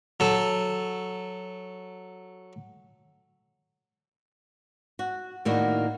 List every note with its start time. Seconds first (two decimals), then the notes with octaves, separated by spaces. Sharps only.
0.20 F#3 A4
4.99 F#4
5.45 A2 D#3 A#3 D4 E4 F#4